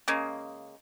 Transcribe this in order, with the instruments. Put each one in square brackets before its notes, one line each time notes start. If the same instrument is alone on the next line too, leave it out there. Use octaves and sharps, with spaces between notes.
[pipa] C#3 G#3 A#3